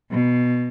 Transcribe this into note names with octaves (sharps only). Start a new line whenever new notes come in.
B2